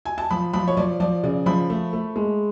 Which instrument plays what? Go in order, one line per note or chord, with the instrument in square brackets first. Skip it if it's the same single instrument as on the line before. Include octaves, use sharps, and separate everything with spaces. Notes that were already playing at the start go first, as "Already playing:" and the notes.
[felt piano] G#5
A5
F3 B5
F3 B5
C#5
F3 D5
F3 D5
C#3 D5
F3 B5
A3
A3
G#3